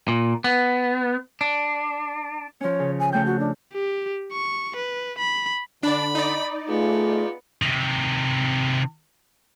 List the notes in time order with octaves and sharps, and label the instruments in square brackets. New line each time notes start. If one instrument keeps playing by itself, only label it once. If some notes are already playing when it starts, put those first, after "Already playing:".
[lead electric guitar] A#2
B3
D4
[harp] F3 C#4 [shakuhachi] C#5
[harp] C#3
[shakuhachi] G#5
[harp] C#3 A3 G6 [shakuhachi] G5
[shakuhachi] F#4
D4
[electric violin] G4
C#6
B4
B5
[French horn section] D3 [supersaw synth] D4 D5 [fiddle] B5
[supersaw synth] D#4 D5
[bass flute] A3 [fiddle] B3 [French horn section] F4 G#4
[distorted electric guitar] C3 D#3